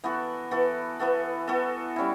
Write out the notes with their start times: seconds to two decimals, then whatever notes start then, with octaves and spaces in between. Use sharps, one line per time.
0.04 E3 B3 F#4 A4
0.51 E3 B3 F#4 A4
0.99 E3 B3 F#4 A4
1.48 E3 B3 F#4 A4
1.96 G3 C#4 E4